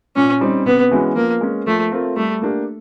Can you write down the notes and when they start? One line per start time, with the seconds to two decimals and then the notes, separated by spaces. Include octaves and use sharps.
0.16 A#2 C#4
0.41 G3 C4 D#4
0.66 C3 B3
0.91 E3 G#3 C#4 F#4
1.16 F3 A#3
1.41 G#3 C#4
1.67 F3 A3
1.92 A3 C4 F4 A#4
2.16 G3 A3
2.42 A#3 D4 G4